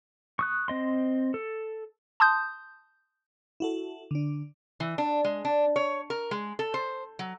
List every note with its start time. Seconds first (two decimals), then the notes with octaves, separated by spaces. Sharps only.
0.39 C#6 D#6 F#6
0.68 C4 D#5 C6
1.34 A4
2.20 A5 C6 D#6 G6
3.60 E4 F#4 A4
4.11 D3 D4
4.80 E3
4.98 D4
5.24 G#3
5.45 D4
5.76 C#5
6.10 A#4
6.31 G#3
6.59 A4
6.74 C5
7.19 F#3